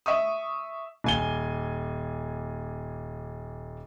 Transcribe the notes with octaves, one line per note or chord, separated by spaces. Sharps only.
E5 C#6 D#6
D#1 G#5 G7